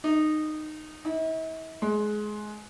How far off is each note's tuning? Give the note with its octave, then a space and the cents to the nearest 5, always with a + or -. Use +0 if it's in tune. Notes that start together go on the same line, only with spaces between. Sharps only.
D#4 -15
E4 -45
G#3 +20